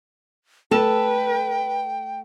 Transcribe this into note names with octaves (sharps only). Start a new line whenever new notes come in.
A3 A4 B4 G5 E7